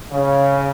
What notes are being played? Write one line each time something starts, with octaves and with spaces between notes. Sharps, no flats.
C#3